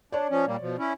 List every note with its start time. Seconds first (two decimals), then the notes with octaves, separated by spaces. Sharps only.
0.12 D4 C#5 D5
0.30 F3 C#4
0.47 A#2 G3 A#3
0.61 B2 F3
0.79 C#4 E4